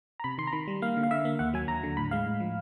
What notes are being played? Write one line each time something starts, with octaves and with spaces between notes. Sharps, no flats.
A#5
C3 B5
D#3 C6
A#5
D#3 B5
G3
A#3 F5
D3
F5
D3 E5
A#3
D#2 F#5
F#3 G#5
D#2 A#5
D3
A2 B5
G#3 F5
A2
F3